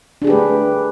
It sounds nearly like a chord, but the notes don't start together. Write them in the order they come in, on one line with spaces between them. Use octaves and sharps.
D4 G#4 G4 B4 A3